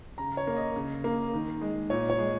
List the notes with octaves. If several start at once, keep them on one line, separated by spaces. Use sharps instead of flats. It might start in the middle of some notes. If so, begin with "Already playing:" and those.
C#3 A#5
C#5
A#3
D#5
C#3
A#3
D#3
G#3
A#2 C#5
C#5
G#3